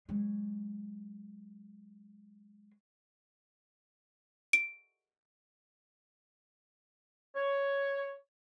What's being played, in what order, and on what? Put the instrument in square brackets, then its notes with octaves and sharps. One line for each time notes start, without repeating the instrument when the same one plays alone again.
[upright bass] F#3 G#3
[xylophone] D7
[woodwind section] C#5